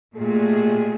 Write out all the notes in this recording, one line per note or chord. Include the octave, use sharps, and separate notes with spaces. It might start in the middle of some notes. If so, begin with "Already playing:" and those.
A#2 G#3 A3 G4 G#4